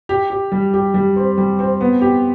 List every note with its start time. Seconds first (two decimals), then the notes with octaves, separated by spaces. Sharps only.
0.09 G4
0.30 G4
0.52 G3
0.74 G4
0.94 G3
1.16 C4
1.38 G3
1.59 C4
1.81 B3
2.01 G4